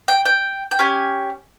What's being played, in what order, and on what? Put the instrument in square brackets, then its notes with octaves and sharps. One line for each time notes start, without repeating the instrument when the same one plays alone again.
[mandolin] G5
G5
G5
C#4 G4 G#5